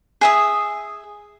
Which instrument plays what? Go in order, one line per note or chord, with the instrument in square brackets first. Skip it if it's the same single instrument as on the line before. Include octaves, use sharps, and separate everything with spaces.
[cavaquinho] G#4 E5 D#6